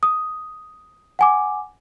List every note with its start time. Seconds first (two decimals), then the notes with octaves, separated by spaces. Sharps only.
0.03 D#6
1.19 F#5 G#5 D6